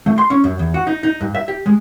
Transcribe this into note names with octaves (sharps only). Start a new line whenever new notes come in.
A3
C6
C#4
F#2
E2
F#4
D#4
D#4
G2
E5
G4
G#3